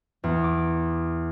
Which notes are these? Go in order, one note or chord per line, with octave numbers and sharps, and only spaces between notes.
E2
D6